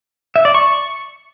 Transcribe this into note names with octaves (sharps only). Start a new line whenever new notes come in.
E5
D5
C#6